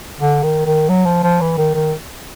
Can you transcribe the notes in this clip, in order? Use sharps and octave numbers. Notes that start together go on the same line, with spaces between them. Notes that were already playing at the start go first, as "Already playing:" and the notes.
D3
D#3
D#3
F#3
F3
F3
E3
D#3
D#3